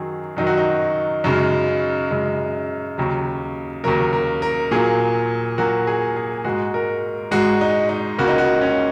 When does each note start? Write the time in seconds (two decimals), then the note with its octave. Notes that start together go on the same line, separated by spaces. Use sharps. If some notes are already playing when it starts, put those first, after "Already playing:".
Already playing: F#2 D#3 F#3 G#4
0.37 F#2 D#3 F#3 D#4
0.47 F#4
0.57 D#4
1.24 F#2 C#3 G#3 D#4
2.11 F#2 C#3 G#3
2.98 D#2 C#3 F#3
3.84 D#2 C#3 F#3 A#4
4.13 A#4
4.42 A#4
4.71 A#2 F#3 A#3 G#4
5.58 A#2 F#3 A#3 F#4
5.87 G#4
6.16 G#4
6.44 G#2 G#3 F#4
6.74 A#4
7.31 G#2 G#3 F#4
7.61 D#4
7.89 D#4
8.18 C#2 C#3 A#3 F#4
8.28 D#4
8.38 F#4
8.61 C#4